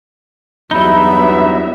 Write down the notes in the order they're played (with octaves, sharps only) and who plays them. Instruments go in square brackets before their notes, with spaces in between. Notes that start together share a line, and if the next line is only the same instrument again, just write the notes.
[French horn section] E2 G2 F#3 [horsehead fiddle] B3 E5 [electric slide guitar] D#4 E4 [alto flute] B5